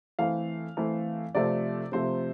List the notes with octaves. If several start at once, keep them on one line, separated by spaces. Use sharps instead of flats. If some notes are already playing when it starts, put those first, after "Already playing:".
E3 A3 C4 F5
E3 A3 C4
C3 F3 A3 C4 D5
C3 F3 A3 C4 C5